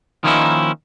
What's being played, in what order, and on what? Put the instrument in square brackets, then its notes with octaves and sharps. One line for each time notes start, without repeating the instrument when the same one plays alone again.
[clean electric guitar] D#3 F3 A#3 C#4 D#4 E4